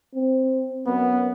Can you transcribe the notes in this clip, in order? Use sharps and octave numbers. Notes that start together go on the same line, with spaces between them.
C4
F#2 B3